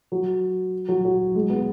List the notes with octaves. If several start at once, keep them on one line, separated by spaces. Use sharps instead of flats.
F#3
F#3
F#3
G#3
B3